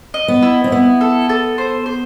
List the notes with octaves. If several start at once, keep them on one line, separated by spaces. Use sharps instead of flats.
D#5
B3
E4
C4
B3 E4
A4
A4
C5
C5